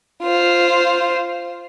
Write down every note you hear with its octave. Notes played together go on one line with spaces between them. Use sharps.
F4 C5